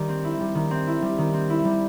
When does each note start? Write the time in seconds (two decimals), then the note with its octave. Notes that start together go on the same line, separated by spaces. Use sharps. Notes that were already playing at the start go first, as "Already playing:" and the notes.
Already playing: D#3 G3
0.09 C4
0.24 E4
0.40 G3
0.55 D#3
0.71 C4
0.87 E4
1.02 G3
1.18 D#3
1.34 C4
1.50 E4
1.65 G3